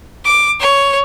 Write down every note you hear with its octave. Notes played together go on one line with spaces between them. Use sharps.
D6
C#5